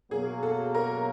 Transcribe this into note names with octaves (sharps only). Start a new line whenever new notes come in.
B2 F#3 A#3 G#4
A4
A#4